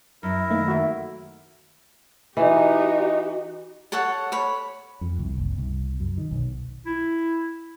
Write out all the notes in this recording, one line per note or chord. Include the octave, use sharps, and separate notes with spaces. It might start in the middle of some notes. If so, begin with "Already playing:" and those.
F#2 E4 A#4
D#3 A3 A#3
F#4 E5
E3 D#4 F#4 G4
A4 C#5 F#5 A5
C#5 B5
F2
C2
F#1
C2
F#2
D#3
B1
E4